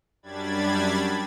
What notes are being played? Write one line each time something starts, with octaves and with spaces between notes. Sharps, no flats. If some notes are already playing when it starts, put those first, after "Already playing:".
F#2 G3 D4 B5 G#6 A6